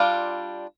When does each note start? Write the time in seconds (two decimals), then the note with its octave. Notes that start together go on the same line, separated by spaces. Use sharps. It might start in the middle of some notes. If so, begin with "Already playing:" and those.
Already playing: G3 D4 F4 F5